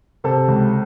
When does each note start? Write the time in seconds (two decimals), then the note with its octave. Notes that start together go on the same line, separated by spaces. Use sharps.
0.24 C3 A4
0.48 C#2